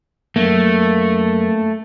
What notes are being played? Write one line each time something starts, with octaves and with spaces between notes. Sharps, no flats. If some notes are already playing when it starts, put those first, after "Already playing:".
F#2 A3 A#3